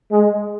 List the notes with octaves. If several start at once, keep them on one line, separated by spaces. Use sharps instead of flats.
G#3